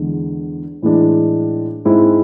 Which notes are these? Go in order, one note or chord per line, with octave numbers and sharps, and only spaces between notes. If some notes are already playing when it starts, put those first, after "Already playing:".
Already playing: E2 D3 G#3
A2 E3 G#3 D4
G#2 G#3 C4 E4